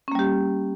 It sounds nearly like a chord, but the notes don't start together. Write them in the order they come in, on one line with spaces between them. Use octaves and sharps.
C#4 A#3 G3 G4